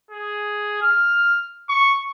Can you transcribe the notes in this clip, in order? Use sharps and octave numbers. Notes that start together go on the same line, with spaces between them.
G#4
F6
C#6